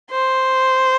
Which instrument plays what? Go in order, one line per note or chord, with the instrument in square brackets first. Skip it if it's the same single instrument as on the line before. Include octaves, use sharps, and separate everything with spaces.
[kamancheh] C5